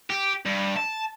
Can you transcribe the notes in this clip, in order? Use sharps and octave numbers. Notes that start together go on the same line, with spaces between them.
G4
G2
A5